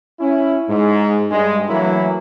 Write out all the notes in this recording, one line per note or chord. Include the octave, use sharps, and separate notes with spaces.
C#4 E4
G#2
G2 G#3
E3 F#3 A3 A#3 E4